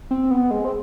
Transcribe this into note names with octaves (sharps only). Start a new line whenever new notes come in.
C4
B3
G#3
C4